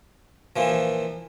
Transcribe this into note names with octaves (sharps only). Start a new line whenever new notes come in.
A#2 E3 F3